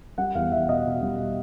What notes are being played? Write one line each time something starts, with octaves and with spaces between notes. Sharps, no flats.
G3 F#5
E2 F5
E2 E5
B2 D#5
B2
G3